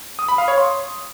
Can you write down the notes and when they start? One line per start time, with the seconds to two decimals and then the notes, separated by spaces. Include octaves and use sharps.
0.19 D#6
0.28 B5
0.38 F5
0.48 C#5
0.58 C6